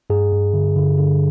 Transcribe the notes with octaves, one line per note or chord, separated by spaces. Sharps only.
G2 G#4
G2
D3
D3
D3